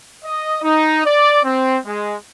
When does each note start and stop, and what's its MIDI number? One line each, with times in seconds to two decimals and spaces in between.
0.24 0.62 75
0.63 1.05 63
1.05 1.39 74
1.44 1.77 60
1.86 2.15 56